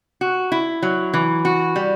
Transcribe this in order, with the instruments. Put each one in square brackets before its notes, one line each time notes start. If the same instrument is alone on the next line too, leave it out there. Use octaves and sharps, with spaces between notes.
[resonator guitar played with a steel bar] F#4
E4
F#3
E3
F#4
G3